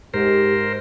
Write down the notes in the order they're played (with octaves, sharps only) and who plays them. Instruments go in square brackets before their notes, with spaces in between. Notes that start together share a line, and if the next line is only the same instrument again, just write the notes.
[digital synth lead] G#2 [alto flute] G4 [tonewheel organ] A#4 C5